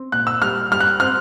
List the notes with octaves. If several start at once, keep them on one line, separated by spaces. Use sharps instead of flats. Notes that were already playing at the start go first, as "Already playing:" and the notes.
Already playing: C4
A#2 F#6
E6
G3 F6
G3 F6
F#6
C4 F6